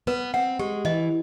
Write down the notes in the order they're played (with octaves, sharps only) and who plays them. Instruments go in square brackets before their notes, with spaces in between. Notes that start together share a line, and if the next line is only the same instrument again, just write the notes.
[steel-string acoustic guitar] B3 [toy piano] B4
[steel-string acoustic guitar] C4 [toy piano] F#5
[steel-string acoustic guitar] G#3 [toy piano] G4
[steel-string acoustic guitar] E3 [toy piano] D#5